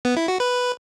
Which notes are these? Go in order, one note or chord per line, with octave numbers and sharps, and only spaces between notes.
B3
E4
F#4
B4